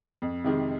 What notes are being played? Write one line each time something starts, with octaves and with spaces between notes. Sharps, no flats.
F2
C3 D#3 G#3